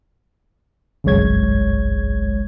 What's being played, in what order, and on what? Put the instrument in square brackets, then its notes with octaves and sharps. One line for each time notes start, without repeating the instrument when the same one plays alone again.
[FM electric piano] G1 C2 F#2 G#3 C#5 G#6